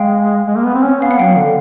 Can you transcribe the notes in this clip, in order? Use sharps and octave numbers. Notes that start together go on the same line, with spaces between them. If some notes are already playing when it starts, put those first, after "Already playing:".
Already playing: G#3 F5 G5
G#3
A#3
B3
C4
C#4
B3 F5
F#5
F#3 F5 G5
D3